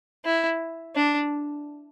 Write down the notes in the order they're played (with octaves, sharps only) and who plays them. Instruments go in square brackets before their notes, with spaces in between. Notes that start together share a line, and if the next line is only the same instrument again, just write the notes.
[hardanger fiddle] E4
D4